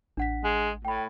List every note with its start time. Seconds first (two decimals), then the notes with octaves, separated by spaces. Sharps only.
0.17 A1 D4 F#5 B6
0.44 G#3
0.85 A2 G5 B5